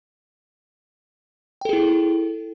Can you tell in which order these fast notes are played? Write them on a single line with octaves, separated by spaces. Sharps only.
G5 A4 G#4 E4